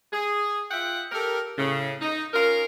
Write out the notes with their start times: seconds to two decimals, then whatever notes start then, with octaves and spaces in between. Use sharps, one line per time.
0.12 G#4
0.71 F4 E5 F#5 G5
1.11 G4 A4 A#4
1.57 A2 C#3
2.01 D#4
2.33 C#4 F4 A#4